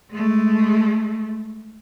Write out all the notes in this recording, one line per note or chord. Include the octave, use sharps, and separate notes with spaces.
G#3 A3